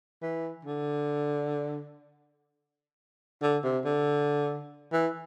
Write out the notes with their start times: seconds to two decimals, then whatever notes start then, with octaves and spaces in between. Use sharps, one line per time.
0.22 E3
0.65 D3
3.42 D3
3.63 C3
3.85 D3
4.92 E3